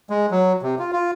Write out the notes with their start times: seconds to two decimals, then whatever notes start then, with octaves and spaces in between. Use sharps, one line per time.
0.10 G#3
0.31 F#3
0.62 C3
0.79 F4
0.93 F4